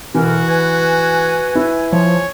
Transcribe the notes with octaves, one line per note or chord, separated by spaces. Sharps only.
B2 D3 E3 F#4 A#4
B4 G#5
E4
F3 C#5